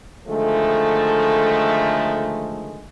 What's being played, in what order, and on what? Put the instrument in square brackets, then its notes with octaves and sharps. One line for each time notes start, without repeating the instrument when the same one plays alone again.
[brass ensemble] D3 D#3 F3 G#3 A3